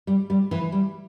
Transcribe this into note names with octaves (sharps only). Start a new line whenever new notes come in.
G3
G3
E3
G3